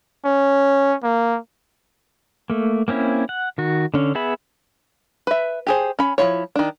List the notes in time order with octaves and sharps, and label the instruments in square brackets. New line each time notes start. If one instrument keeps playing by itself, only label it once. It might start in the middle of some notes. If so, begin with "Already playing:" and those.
[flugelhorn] C#4
A#3
[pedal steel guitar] A3 A#3
A#3 C4 C#4 E4
F#5
D#3 F#4
D3 C#4
B3 G#4 E5 B5
[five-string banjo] B4 E5
G4 G#4 C5
C#4 B5
F3 A3 E4 C#5
D#3 D4